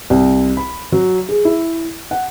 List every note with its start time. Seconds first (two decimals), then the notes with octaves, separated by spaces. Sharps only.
0.10 C2
0.57 B5
0.92 F#3
1.29 G#4
1.45 E4
2.11 F#5